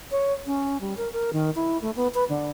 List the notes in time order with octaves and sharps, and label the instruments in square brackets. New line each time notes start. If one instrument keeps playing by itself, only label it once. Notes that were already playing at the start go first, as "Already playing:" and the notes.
[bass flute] C#5
C#4
G3
A#4
A#4
D#3
E4
A3
B3
B4
D3